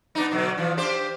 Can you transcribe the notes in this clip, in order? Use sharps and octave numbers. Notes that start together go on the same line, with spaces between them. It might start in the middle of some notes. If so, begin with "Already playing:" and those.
B3 D4 D#4
B2 D3 F#3
E3 F3
D4 G4 C5